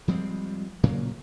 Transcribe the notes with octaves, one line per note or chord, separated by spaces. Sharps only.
F3 G3 G#3 C4
A#2 C#3 F#3 A#3